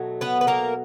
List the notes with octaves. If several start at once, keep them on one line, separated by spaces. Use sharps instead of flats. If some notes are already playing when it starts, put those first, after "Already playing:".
Already playing: B2 F#3 A3
B3 B4
B4
A#3 A#4